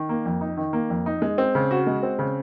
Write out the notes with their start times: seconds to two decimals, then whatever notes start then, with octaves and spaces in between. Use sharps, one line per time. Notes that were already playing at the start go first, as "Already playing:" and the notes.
Already playing: D#3
0.09 A#3
0.26 F2
0.41 D#4
0.57 D#3
0.73 A#3
0.90 F2
1.06 D#4
1.22 G#3
1.38 C4
1.55 C#3
1.71 F#4
1.87 G#3
2.03 C4
2.19 C#3